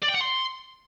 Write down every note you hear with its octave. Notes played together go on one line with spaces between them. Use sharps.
D5
G5
F#5
C6